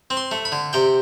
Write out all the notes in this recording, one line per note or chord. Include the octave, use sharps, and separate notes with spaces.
C4
C6
A3
B5
D3
C3 G5